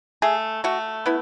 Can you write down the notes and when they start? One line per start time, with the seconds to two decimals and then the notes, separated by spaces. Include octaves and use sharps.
0.22 A3 G#4
0.64 A3 F#4
1.06 B3 E4